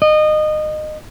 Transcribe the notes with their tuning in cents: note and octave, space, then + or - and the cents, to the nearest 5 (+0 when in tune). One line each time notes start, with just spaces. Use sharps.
D#5 -25